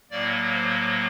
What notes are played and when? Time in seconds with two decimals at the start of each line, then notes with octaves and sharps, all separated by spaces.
0.11 A2 F#3 A#3 D5
0.53 C5